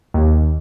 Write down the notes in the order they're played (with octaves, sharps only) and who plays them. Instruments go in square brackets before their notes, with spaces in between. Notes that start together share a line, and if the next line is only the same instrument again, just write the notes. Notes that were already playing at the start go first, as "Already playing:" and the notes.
[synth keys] D#2